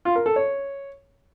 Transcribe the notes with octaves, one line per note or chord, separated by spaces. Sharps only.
F4
A#4
A4
C#5